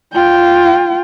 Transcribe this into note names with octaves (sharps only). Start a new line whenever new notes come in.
F4 G5